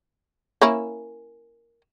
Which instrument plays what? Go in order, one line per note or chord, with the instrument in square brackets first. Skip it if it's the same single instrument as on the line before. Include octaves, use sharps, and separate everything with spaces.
[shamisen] A#3 C#4 E4